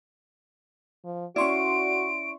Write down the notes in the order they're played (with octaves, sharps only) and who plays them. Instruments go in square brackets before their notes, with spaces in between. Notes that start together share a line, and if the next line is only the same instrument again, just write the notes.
[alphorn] F3
[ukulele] C#4 E4 [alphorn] F#4 [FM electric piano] D5 C6 C#6 [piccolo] D7